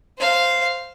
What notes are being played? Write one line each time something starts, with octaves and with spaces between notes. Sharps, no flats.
C5 F5